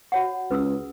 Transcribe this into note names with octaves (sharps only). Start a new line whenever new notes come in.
F#4 C#5 F#5
C#2 B4 D#6 E6